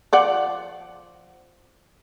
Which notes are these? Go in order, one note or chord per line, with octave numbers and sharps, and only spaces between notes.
F3 D5 F#5